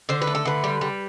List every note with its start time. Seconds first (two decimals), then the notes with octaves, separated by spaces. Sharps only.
0.09 D3 C5
0.22 B4
0.27 A3
0.35 A4
0.45 D3 B4
0.64 G3
0.81 G3